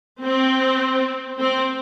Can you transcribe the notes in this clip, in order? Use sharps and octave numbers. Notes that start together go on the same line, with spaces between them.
C4
C4